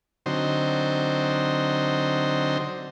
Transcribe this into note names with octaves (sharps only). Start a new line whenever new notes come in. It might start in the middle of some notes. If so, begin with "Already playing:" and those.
D3 F#3 C4 D#4 C5